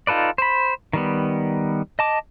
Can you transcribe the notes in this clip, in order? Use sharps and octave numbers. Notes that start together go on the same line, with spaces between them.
D#4 F4 A4 B4 D5
C5 B5
D#3 G3 B3
D#5 A5 D6